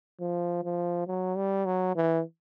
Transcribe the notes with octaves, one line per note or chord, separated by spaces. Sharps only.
F3
F3
F#3
G3
F#3
E3